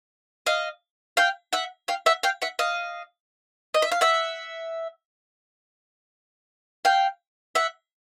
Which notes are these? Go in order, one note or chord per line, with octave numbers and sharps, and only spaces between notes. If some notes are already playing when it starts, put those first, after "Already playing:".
D#5 F5
F5 G5
E5 F#5
F5 G5
E5 F#5
F5 G5
E5 F#5
D#5 F5
D#5
E5
F5
E5 F#5
F5 G5
E5 F#5